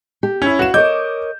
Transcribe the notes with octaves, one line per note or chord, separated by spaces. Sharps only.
G4
C#4 E4
F#4 B4 F5 E7
A#4 C#5 D#5 D6 G6